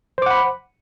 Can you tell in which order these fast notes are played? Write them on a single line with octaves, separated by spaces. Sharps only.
C5 D6 F#5 B5